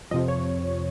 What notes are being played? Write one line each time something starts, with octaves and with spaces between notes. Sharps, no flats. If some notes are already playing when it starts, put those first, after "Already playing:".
F2 C3 F3 D#5
C#5